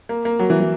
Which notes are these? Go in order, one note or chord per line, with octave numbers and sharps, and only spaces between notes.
A#3
A#3
F#3
E3
E3